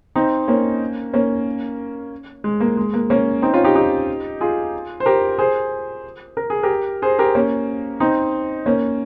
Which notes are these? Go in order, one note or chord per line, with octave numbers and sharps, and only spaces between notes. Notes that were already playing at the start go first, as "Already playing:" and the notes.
C4 D#4
A#3 C#4
A#3 C#4
G#3
A#3
G#3
A#3
A#3 C#4
C4 D#4
C#4 F4
D#4 G4
D#4 G4
F4 G#4
C5
G4 A#4
G#4 C5
A#4
G#4
G4 A#4
G#4 C5
G4 A#4
A#3 C#4
C4 D#4
A#3 C#4